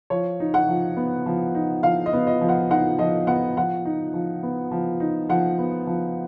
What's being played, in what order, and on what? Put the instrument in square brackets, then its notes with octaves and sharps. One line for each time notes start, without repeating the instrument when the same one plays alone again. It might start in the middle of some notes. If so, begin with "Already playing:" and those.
[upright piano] F3 C#5
D#4
F#5
F3
B3
F3
D#4
F3 F5
D#5
B3
D#5
F3
F#5
D#4 F#5
F3 D#5
B3 F#5
F3 F#5
D#4
F3
B3
F3
D#4
F3 F#5
B3
F3